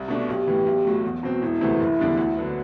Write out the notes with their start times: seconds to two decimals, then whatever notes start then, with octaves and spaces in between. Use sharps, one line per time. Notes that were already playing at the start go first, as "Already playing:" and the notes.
Already playing: C2
0.08 B2 A3 D4
0.28 B1 G4
0.47 A2 E3
0.66 B1
0.85 A2 F#3 A3
1.04 E2 F#4
1.23 B2 F#3 C4
1.42 E1 E4
1.61 D2 C3 E3 A3
1.80 F#1
1.99 E2 D3 G3 D4
2.18 D2
2.37 D3 F#3 B3